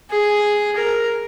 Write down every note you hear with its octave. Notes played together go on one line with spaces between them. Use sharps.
G#4
A#4